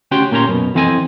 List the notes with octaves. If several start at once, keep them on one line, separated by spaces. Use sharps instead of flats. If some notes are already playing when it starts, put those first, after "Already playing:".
D2 C#4 F#4 G4 G5 C6
A#2 A#3 C#4 G4 A#5 C6
F#2 B2
F2 E3 C4 A4 D#5 G#5